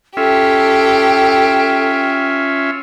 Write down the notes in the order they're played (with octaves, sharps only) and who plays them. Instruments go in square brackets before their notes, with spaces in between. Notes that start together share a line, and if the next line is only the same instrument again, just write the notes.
[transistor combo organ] C#4 F4 E5 [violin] G4 [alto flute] A4